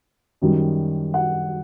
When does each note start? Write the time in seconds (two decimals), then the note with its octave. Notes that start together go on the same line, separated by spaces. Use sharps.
0.42 F#2 D#3 G3
1.14 F#5